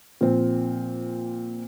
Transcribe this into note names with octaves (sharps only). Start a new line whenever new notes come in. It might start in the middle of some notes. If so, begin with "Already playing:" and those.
A#2 F3 C4